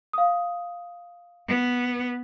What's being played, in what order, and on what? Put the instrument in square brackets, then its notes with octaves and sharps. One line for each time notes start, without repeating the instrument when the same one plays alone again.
[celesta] F5 D#6
[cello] B3